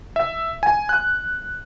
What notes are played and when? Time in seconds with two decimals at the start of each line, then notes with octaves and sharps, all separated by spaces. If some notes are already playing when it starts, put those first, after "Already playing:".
0.16 E5
0.63 G#5
0.89 F#6